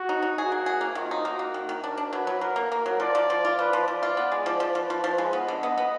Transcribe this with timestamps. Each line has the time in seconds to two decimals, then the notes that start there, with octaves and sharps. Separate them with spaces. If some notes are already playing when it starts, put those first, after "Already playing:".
Already playing: F#4
0.09 D#4
0.22 D#4
0.37 F#4 G#4
0.52 A#3
0.66 G#4
0.81 A#3
0.95 D#3 F4
1.11 D#4
1.25 A#3 F#4
1.39 A#3
1.54 D#3
1.69 D#3
1.84 D4 A#4
1.97 D4
2.13 F#3 B4
2.27 F#3
2.41 F#3 A#4
2.56 A#3
2.71 A#3 A#4
2.86 F#3
3.00 F3 D5
3.15 F3
3.30 F3
3.45 F4
3.59 F3 B4
3.73 F3
3.87 F3 D5
4.03 F4
4.17 B3
4.32 G#3
4.46 F3
4.60 F3
4.75 F3 B4
4.90 F3
5.04 F3 B4
5.18 G#3
5.33 B3 D#5
5.48 D3
5.63 B3 D#5
5.78 B3